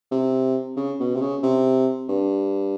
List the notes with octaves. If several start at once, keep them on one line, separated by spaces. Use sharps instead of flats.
C3
C#3
B2
C3
C#3
C3
G2